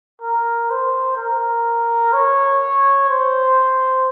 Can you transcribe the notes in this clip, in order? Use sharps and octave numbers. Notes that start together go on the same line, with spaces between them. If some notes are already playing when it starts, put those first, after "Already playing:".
A#4
C5
A#4
C#5
C5